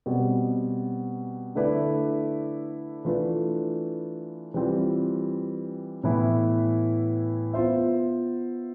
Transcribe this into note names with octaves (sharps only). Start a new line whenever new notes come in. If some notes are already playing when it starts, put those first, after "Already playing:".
B2 G3 C4
D3 A3 E4 B4 D5
E3 A3 D4 F4 B4
E3 G3 C4 F4
A2 E3 B3 E4
B3 F4 C5 E5